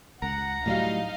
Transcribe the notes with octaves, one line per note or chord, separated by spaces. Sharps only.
C#2 F#5 A#5
A2 F#3 G3 D#4 F5